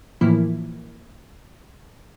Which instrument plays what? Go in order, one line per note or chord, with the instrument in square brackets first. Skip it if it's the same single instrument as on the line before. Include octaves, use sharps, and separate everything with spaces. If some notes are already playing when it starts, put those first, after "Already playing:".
[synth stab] A2 E3 F3 A#3 E4